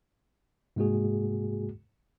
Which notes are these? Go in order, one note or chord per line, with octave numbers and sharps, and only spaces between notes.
G#2 C3 G#3 A#3 F#4 G#4